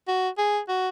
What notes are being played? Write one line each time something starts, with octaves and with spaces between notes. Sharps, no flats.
F#4
G#4
F#4